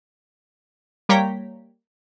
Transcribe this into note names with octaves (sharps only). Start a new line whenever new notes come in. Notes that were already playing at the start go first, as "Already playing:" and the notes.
G3 A#3 C#5 G5 A#5 B6